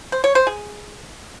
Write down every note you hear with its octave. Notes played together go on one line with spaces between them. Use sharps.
C5
C#5
C5
G#4